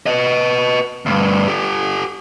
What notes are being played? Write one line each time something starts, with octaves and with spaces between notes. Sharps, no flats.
B4 D#5
D2 G2
G4 A4